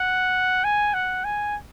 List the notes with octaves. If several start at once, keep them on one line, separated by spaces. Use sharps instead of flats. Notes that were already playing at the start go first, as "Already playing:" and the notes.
Already playing: F#5
G#5
F#5
G#5